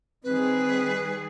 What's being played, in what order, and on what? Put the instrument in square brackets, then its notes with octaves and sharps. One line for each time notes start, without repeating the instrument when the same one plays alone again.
[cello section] D#3 G3 G#4 [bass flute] C4 [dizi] B4